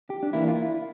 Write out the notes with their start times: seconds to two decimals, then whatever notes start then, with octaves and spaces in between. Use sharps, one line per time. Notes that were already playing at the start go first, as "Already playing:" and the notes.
0.10 G4
0.23 D4
0.33 E3 A#3 D4 E4
0.48 F4
0.55 E4